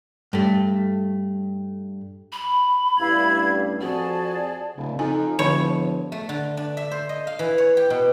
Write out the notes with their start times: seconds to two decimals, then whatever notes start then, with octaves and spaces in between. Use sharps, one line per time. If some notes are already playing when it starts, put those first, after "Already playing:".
0.33 G2 A3
2.32 B5
2.99 A1 G2 E4 F5 G#6
3.81 F2 C4 F#4 G#4 D5 A5
4.77 D1 C#3
4.99 F2 D#4 G#5
5.39 E1 D3 F3 C#5 B5
6.12 A3
6.29 D3
6.57 D4
6.77 E5
6.91 C5
7.09 D#5
7.27 F5
7.39 E3
7.58 C#5
7.77 G4
7.90 B2